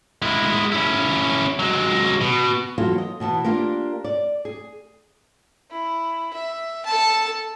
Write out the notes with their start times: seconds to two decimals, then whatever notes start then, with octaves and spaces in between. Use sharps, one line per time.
0.22 G#3 E4
0.72 C#4 E4
1.59 F#3 G#3
2.21 B2
2.78 E3 F#3 A#3 F4 F#4 A4
2.98 D#5
3.20 B2 E3 B3 A5
3.44 A#3 D4 F4 G4 A#4
4.04 D5
4.45 G#4
5.71 E4
6.33 E5
6.85 A4 A5